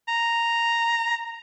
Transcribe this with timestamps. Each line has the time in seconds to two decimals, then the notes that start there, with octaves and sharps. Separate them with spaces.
0.08 A#5